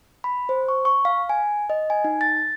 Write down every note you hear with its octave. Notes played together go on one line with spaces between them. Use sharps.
B5
C5
C#6
C#6
F5
G#5
D#5
G#5
D#4
A6